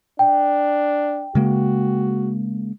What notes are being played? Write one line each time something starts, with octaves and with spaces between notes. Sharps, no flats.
D4 G5
C#3 G#3 A#3 F#4